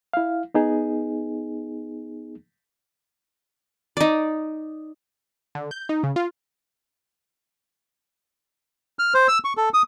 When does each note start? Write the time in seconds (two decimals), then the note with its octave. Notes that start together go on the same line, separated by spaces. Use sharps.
0.13 E4 F5
0.54 B3 D#4 G#4
3.97 D#4 D5
5.55 D3
5.71 G6
5.89 D#4
6.03 C#3
6.16 F4
8.99 F6
9.14 C5
9.28 E6
9.44 C#6
9.57 A4
9.74 D#6